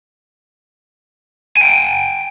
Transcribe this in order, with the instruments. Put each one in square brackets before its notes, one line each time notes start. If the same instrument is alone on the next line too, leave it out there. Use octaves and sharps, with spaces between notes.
[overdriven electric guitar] G5 G#5